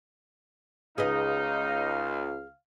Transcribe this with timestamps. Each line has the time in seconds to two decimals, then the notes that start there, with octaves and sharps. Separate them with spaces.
0.98 C#2 D#4 G#4 B4 D#5 F5